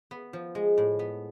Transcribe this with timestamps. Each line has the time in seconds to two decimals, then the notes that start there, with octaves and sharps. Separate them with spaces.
0.11 B3
0.33 F3
0.55 G#3
0.78 A2
0.99 B3